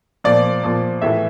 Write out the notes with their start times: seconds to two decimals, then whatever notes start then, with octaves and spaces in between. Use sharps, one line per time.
0.24 A#2 F3 D5
0.63 A#2 F3
1.02 A2 E3 E5